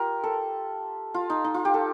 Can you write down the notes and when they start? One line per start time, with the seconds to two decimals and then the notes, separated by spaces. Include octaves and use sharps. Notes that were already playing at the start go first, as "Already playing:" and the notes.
Already playing: F4 G4 A#4
0.24 A4
1.14 F4
1.30 D#4
1.44 D#4
1.54 F4
1.65 G4
1.74 A4